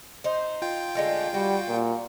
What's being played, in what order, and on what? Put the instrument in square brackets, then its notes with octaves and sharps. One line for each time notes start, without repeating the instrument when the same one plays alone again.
[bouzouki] D#4 C5
[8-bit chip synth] F4 G5
[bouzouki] D3 G#3 A3
[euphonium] G3 [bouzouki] F#4
[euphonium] A#2